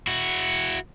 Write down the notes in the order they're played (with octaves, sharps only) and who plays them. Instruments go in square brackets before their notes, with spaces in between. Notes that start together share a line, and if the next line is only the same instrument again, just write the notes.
[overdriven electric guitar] E4 F#4